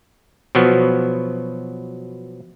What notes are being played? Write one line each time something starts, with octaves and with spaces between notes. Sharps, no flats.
B2 F3 F#3 B3